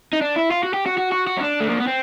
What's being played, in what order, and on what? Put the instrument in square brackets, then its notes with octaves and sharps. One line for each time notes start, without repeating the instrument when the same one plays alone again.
[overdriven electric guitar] D#4
D4
E4
F4
F#4
G4
F#4
F#4
F#4
F#4
C#4
D4
A3
A#3
B3
C4